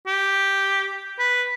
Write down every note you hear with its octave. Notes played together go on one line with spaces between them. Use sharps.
G4
B4